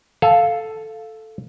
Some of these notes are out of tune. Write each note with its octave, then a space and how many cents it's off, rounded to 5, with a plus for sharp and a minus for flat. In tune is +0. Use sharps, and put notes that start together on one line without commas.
A4 +0 F5 +0 G#5 +30